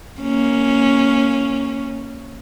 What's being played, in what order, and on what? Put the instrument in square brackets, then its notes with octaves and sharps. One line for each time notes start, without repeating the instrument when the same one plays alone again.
[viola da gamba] A#3 C#4